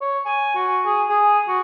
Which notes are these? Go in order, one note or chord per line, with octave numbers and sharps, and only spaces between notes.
C#5
G#5
F#4
G#4
G#4
F#4